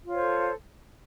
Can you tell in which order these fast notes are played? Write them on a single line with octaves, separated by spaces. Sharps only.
F4 C#5 C5 A4